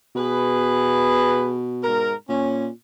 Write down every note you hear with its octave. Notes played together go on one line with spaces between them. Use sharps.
B2 G#4 B4
G#2 A#4
A#2 C#4